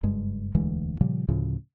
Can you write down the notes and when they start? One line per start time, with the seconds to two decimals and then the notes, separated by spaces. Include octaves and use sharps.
0.03 F#1 G2 G#3
0.55 E1 D2 E3 G#3
1.01 A#2 C#3 F3 G3
1.29 D2 A2 C#3 F3